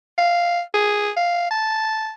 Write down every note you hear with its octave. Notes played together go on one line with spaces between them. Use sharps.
F5
G#4
F5
A5